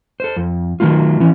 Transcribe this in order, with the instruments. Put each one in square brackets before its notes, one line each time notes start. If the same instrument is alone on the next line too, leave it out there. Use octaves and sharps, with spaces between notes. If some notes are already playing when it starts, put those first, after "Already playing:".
[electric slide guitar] A4 C5
F2
D#3 F#3 G3 A3 F4
E3 C#4